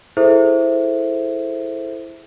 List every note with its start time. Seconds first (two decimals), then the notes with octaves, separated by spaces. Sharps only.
0.17 E4 G#4 A4 C5 E5